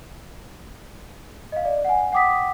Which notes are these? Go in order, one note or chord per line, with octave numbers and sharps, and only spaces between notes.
D#5 F5
D5
F#5 G#5
F#5 G5 D6 D#6 B6